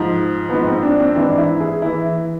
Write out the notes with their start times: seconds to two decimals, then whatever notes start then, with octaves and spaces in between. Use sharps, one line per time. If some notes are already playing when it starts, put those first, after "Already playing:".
Already playing: G#2 F3
0.49 G#2 F3 B3
0.67 C4
0.83 D4
0.99 C4
1.16 G#2 E3 D4
1.38 E4
1.60 G#4
1.82 E3 E4